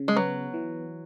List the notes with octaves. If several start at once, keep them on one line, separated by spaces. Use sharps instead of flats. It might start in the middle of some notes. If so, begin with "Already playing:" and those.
Already playing: C#3
G#3
F#3 B3
E3